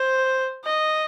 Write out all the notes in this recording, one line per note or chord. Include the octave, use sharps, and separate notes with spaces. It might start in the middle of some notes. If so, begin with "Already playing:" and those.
Already playing: C5
D#5